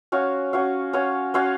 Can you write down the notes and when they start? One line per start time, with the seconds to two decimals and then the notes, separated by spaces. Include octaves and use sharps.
0.12 C#4 F#4 C#5 F5
0.53 C#4 F#4 C#5 F5
0.93 C#4 F#4 C#5 F5
1.34 C#4 F#4 C#5 F5